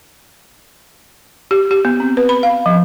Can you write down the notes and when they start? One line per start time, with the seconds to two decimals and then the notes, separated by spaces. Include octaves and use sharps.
1.51 G4
1.71 G4
1.85 B3
2.00 C4
2.17 B4
2.29 B5
2.43 F5
2.66 F3